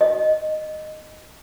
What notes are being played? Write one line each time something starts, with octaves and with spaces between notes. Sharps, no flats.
D#5